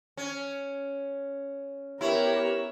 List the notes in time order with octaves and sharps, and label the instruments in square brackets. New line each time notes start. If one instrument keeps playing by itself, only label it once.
[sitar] C#4
[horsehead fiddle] B3 A#4 [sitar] E4 [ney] G4 [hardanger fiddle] C#5